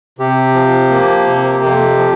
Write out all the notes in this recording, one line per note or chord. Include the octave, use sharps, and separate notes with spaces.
C3 G4
F3
A#3
C3
F2
F3